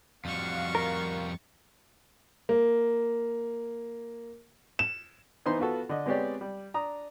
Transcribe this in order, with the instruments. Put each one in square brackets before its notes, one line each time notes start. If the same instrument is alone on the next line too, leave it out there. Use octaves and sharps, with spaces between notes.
[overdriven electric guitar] F2 G3 [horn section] F#4 F5 [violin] C#6 A6
[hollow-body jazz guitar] A#4
[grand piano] A#3
E7
[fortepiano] E3 B3 D#4 C5 C6
B3 F4 F#4 A4
D3 D#5
G#3 B3 C4 G4 C#5 D5
G3
D4 A#5 D#6